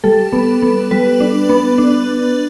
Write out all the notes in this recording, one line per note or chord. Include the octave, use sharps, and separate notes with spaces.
G3 A4
B3
B3
G3 B4
D4
B3
D4